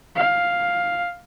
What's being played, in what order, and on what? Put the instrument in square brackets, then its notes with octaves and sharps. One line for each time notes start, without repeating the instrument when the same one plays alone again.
[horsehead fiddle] F5